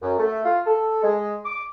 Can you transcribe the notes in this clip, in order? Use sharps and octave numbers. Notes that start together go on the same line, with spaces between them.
F#2
A3
F4
A4
G#3
D6